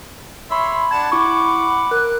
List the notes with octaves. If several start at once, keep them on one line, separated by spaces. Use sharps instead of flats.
C#5 E5 B5 C6
D4 F#5 A5 G#6
E4 F#5 C#6 D6
A#4 F#6